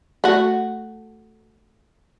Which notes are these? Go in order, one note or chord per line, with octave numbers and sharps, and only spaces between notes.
A3 F#4